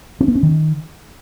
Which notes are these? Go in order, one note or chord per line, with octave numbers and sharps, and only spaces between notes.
C4
B3
C#4
D#3